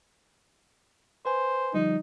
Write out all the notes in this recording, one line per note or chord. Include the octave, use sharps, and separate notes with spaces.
B4 C5 G#5
D3 F3 G3 D#4